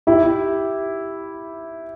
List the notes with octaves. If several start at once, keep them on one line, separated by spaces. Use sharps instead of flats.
E4 G4